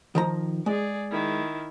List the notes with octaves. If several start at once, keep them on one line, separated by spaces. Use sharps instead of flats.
D#3 F3 A#5
G#3 G#4 D5
D#3 E4